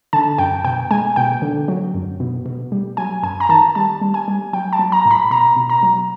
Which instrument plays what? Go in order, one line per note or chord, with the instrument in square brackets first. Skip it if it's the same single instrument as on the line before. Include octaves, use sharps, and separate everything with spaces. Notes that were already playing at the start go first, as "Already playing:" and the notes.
[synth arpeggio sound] D3 A5
F#2 G5
B2 G5
G#3 G#5
B2 G5
D3
F#3
F#2
B2
B2
G3
F#3 G#5
F#2 G#5
A#5
D#3 A5
G3 A5
G3
G#5
G3
F#3 G5
A5
F#3
A#5
A2
B5
B2 A#5
B2
A#5
F#3